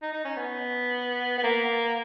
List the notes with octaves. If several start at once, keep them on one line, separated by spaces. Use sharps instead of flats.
D#4
D#4
C#4
B3
B3
A#3